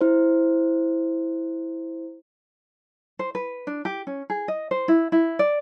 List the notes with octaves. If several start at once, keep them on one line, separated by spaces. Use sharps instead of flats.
E4 C5
C5
B4
D4
G4
C#4
G#4
D#5
C5
E4
E4
D5